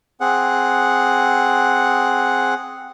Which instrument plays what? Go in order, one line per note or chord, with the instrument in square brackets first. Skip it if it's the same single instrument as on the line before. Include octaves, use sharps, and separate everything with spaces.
[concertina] C4 G#4 F#5